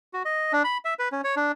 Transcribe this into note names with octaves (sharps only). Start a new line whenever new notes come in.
F#4
D#5
D4
B5
E5
B4
C#4
C#5
D4